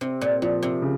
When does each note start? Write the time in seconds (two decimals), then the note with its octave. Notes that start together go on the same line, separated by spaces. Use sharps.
0.01 C3 C4
0.21 A#2
0.42 A#2 F3
0.63 C3
0.82 C#3